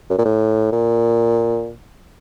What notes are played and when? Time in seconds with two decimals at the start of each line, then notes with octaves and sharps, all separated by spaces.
0.10 F#2
0.18 A#2
0.25 A2
0.72 A#2